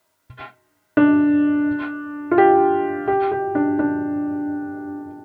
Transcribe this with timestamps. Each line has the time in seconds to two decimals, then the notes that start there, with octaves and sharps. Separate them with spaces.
0.97 D4
2.31 F4
2.38 G4
3.08 G4
3.31 G4
3.55 D4
3.79 D4